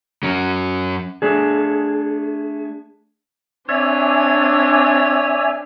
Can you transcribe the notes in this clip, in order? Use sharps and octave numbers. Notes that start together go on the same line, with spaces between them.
F#3 C#4
A3 D4 G#4
C4 D4 C#5 D5 E5 G#5